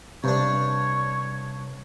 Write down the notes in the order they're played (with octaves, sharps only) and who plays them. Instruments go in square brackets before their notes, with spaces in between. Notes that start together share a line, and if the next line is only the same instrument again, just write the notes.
[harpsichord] G2 D4 [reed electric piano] C3 [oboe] C#5